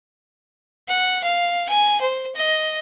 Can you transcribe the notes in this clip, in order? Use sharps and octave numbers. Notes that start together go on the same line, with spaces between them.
F#5
F5
G#5
C5
D#5